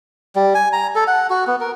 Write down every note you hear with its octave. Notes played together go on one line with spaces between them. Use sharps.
G3
G#5
A#5
A4
F#5
F#4
B3
A#4